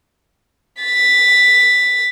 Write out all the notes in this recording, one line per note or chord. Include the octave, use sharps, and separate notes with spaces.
A6 B6